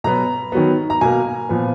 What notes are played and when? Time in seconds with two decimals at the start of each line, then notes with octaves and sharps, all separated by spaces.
0.04 B2 F#3 B3 A#5
0.52 D#3 F#3 B3
0.90 A#5
1.01 B2 A#3 G#5
1.49 A#2 F3 B3